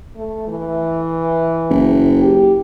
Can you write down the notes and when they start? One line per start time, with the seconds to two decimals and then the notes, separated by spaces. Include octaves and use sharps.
0.16 A3
0.48 E3
1.70 F#1
2.22 G4